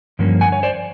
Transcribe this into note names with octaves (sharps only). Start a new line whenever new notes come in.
G2 D3 F3 A#3 C#4
F#5 G#5
C#5
C5 D5